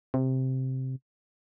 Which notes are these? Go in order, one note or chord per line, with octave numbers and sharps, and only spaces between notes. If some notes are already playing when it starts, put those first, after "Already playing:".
C3